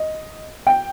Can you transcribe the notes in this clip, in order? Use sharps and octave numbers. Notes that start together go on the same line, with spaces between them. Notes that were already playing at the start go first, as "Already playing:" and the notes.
Already playing: D#5
G5